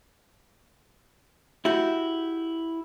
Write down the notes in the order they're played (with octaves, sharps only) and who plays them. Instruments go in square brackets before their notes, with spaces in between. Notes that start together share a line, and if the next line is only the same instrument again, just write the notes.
[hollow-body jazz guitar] E4 F#4 G4